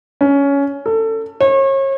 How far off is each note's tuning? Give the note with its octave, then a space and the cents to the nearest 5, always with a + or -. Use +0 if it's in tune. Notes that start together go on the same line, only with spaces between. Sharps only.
C#4 +15
A4 +25
C#5 -35